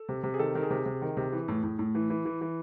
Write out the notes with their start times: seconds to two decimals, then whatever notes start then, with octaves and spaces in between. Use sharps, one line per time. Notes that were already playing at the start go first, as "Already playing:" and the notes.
Already playing: A4
0.09 C3
0.23 C3
0.34 G#4
0.39 D#3 A4
0.55 D#3
0.63 G#4
0.70 C3
0.86 C3
1.02 D#3
1.17 C3
1.32 E3
1.48 A2
1.64 A2
1.79 A2
1.95 E3
2.10 E3
2.25 E3
2.41 E3